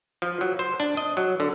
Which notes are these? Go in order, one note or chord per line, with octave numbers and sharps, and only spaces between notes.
F3
F#3
C5
D4
D#5
F#3
D3